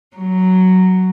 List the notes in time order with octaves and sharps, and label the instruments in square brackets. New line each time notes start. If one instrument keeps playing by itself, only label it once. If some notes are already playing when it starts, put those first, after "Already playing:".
[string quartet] F#3